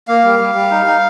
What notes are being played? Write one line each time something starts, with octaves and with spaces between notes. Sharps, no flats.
A#3 F5
G3
G3
G3
D#4
D#4